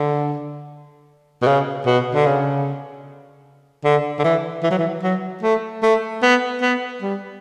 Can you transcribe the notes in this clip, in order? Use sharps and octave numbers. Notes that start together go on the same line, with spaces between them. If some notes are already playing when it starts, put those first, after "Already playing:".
Already playing: D3
B2
C#3
B2
D3
C#3
D3
D3
E3
E3
F#3
E3
F#3
A3
A3
B3
B3
G3